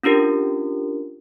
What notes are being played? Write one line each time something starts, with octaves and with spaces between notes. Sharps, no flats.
C#4 D4 F4 G4 A#4